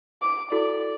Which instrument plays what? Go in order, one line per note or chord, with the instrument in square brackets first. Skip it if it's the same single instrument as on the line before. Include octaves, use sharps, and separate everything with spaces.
[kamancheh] D6
[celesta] E4 F#4 A4 [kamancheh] D5